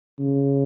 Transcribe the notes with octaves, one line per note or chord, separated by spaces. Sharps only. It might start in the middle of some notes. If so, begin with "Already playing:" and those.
C#3